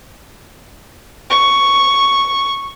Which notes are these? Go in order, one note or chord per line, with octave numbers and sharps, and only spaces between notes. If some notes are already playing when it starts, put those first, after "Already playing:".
C#6